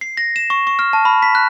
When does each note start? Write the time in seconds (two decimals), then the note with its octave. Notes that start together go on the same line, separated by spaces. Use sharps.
0.01 C7
0.17 A#6
0.36 E7
0.50 C#6
0.67 C#6
0.79 F6
0.93 A5
1.05 B5
1.22 B6
1.35 F#6